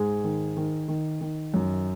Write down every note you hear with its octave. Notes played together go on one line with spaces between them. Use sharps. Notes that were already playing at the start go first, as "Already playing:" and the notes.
Already playing: G#2 G#4
D#3
D#3
D#3
D#3
F#2